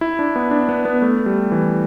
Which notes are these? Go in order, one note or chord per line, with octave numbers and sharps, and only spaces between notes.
E4
D4
B3
D4
B3
B3
A3
G3
E3